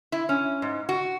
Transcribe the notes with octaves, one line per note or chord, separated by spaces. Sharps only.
E4
C#4
G#2
F#4